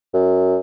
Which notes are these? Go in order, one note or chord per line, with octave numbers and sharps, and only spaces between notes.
F#2